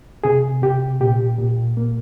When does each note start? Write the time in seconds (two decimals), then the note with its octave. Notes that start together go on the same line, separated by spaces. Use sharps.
0.24 C3 G#4
0.63 C3 G4
1.00 A#2 G4
1.39 A#2
1.77 A#3